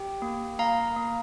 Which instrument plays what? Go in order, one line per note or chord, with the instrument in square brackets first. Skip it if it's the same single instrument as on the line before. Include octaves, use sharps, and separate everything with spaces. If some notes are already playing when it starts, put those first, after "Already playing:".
Already playing: [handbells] G4 G5
A#3
A#3 F5 A#5
A#3